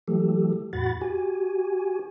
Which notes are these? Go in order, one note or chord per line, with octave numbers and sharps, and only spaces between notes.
E3 F#3 A3 G4 A4
E2 A2 F#4 F#5 B5 A6
F#4 G4 G#5